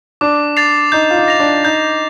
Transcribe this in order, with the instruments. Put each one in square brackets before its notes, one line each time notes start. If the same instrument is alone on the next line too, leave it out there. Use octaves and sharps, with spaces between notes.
[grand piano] D4 [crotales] D6
[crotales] A6 C7 F7
[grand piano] D#4 [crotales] G6
[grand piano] F4
D#4
[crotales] A#6 F7
[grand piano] D4
[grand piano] D#4 [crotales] G6